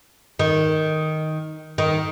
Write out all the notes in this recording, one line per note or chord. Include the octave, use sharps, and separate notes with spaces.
D#3
D#3